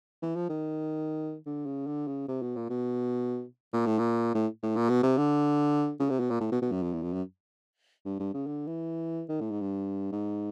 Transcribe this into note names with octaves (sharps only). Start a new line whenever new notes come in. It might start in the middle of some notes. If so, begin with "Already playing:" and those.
E3
F3
D#3
D3
C#3
D3
C#3
C3
B2
A#2
B2
A#2
A2
A#2
A2
A2
A#2
B2
C3
D3
C#3
C3
B2
A#2
A2
B2
B2
F#2
F2
E2
F2
F#2
G2
G2
C#3
D3
E3
D#3
A2
G#2
G2
G#2